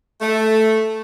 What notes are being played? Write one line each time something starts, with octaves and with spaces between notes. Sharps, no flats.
A3